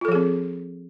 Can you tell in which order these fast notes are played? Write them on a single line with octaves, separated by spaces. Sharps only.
F4 A4 F3 G#4 C4